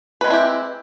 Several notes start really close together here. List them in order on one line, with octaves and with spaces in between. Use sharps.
B4 G#3 C4 E4 G4